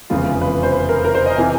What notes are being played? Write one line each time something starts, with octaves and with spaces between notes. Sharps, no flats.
F1 E2 C#3 F3 G#3 F4
B4
C5
B4
A#4
A#4
C5
D#5
C3 E3 G#5